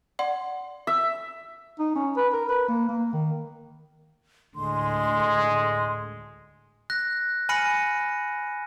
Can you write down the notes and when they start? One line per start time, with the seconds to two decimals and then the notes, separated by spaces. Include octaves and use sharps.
0.19 D5 F#5 C6
0.87 E5
1.79 D#4
1.96 C#4
2.17 B4
2.33 A#4
2.49 B4
2.68 A#3
2.89 A#3
3.13 D#3
4.56 D2 A2 D3 G#3 C6
6.90 F#6 A#6
7.49 G#5 B5 F6 A#6 C#7 D#7